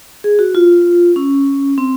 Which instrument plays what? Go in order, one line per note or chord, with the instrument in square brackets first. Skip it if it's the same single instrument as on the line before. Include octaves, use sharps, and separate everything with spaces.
[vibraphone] G#4
F#4
F4
C#4
C4